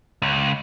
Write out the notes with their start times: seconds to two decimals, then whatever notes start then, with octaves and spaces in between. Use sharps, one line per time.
0.22 C#2